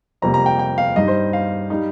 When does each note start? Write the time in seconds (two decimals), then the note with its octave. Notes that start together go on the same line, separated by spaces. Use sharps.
0.22 F2 C3 G3 A#3 A#5
0.34 A#5
0.46 G5
0.59 G5
0.78 F5
0.96 G2 G3 D#4 D#5
1.08 C5
1.33 F5
1.70 G3 D#4